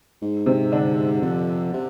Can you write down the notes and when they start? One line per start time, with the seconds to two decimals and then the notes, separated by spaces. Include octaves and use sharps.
0.22 G#2
0.46 C3 C4
0.72 D3 D4
1.22 F2
1.73 C3